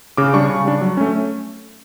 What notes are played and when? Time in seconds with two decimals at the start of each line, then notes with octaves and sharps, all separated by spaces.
0.17 C#3 D6
0.33 G3 D4 C#6
0.50 C#3
0.65 G3 D4
0.81 F#3
0.97 A3 C#4